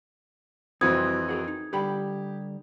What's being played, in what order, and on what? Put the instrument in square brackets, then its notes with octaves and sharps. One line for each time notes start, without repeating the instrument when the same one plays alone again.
[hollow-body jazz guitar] C2 F#4 [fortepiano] F2 E3 C4 [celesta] D#6 G#6
[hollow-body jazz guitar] F#4 G#4 A#4
D#4
[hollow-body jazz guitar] D3 G3 B5 [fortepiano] G4